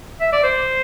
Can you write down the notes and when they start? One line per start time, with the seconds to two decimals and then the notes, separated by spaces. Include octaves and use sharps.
0.20 E5
0.33 D5
0.44 C5